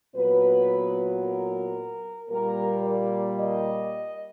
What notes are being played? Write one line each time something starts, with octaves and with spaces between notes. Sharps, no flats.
A#2 F#3 B3 B4
A#4
A#2 G3 A#3 A#4
D5
D#5